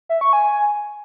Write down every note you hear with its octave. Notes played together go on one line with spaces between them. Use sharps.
E5
C#6
G#5